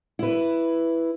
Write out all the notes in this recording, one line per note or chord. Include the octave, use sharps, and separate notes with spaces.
E4 B4